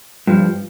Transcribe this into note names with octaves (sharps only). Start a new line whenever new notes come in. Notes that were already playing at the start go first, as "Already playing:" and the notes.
G2 F3